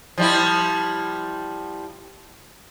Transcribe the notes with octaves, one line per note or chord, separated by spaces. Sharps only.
F3 G3 E4